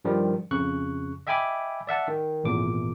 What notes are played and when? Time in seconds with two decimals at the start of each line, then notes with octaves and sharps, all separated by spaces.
0.05 G2 D#3 F3 G3
0.51 F2 C#3 C#6 F#6
1.27 D#5 E5 G5 G#5 B5 D6
1.87 D5 E5 F#5 A5
2.08 D#3
2.44 G#1 E2 A#2 D6